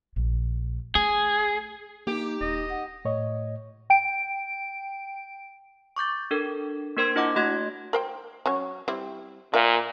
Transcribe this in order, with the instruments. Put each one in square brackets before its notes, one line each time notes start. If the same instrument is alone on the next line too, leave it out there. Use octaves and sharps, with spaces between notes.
[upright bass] A#1
[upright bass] A3 [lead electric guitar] G#4
[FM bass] A#3 [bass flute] D#4 [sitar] G4
[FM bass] D#1 [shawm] D#5
[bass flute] F#5
[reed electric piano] A2 C#5 D#5
[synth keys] G5 D7
[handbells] C#6 D6 G6 A6
D4 A4 A#4
A#3 D4 A#4 C5 C6 G#6
D4 E4 F4 D#5 F#5 D6
A3 F#4 D#5 C6 G#6 A#6
[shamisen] A#4 C5 G5
F#3 C#4 C#5
G3 C4 E4
[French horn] A#2 [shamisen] A#4 E5 F5